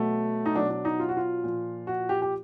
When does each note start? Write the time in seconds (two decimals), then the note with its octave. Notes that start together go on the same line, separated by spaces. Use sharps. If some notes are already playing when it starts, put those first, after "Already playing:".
Already playing: B2 F#3 A3
0.46 D#4
0.55 B2 F#3 D4
0.70 D4
0.85 D#4
1.00 F4
1.09 F#4
1.17 F4
1.44 A#2 F3
1.87 F#4
2.09 G4
2.22 G4